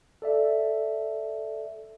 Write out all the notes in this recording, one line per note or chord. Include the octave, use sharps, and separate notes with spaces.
A4 D5 E5